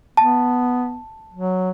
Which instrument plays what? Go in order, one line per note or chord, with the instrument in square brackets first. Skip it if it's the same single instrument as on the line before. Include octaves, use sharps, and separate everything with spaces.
[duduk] B3 [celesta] A5
[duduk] F#3